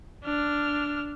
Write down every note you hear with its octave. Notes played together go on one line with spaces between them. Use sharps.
D4 F6